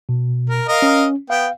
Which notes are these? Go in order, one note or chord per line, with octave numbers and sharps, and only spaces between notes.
B2
A#4
A#4 D#5 F5
C#4
B3 F5 G5